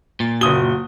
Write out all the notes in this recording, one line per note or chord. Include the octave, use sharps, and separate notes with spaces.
A#2 A6
F#1 F#4 D#6 G7